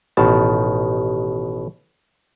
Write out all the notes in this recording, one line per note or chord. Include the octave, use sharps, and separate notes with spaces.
A1 B2 D#3 A5